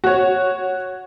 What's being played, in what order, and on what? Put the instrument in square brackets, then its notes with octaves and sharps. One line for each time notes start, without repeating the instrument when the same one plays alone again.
[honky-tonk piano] F#4 C#5